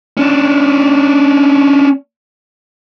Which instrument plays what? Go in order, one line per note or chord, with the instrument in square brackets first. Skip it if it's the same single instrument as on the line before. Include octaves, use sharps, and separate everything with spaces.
[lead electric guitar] C#4 D4